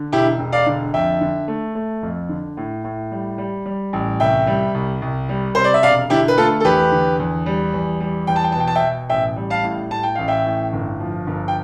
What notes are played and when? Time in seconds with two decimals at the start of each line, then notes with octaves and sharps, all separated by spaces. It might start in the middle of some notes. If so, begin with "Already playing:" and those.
Already playing: D3
0.12 E1 E4 G4
0.39 E1
0.52 D5 F5
0.66 D3
0.94 F2 E5 G5
1.21 D3
1.48 A3
1.75 A3
2.03 F2
2.29 D3
2.57 A2
2.84 A2
3.12 G3
3.38 G3
3.66 G3
3.93 A1
4.20 C2 E5 G5
4.47 G3
4.74 C2
5.02 C2
5.29 G3
5.55 C3 C5
5.64 D5
5.74 E5
5.83 E1 D5 F5
6.10 D3 E4 G4
6.28 B4
6.37 A3 F4 A4
6.60 A4
6.65 E2 G4 B4
6.92 D3
7.19 E2
7.46 G3
7.74 E2
8.00 G3
8.27 E2 G5
8.36 A5
8.44 G5
8.52 A5
8.55 B2 G5
8.67 A5
8.75 E5 G5
8.82 B2
9.09 A1 E5 G5
9.36 G3
9.50 F5 A5
9.64 A2
9.91 A2 A5
10.03 G5
10.15 A1 F5
10.28 E5 G5
10.46 A2
10.73 G1
11.00 F3
11.27 G1
11.48 G5